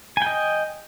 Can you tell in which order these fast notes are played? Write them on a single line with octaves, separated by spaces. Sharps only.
G#5 G5 D#5